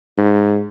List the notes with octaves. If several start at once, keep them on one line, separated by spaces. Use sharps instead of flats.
G#2